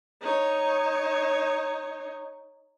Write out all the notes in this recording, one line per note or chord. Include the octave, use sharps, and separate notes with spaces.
D#4 C#5